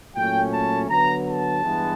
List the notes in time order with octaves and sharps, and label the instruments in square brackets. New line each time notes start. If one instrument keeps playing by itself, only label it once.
[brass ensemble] A#2 F#3 A3 C#4 G5
A5
D3 F#3 B3 A#5
A5
G2 E3 G#3 B3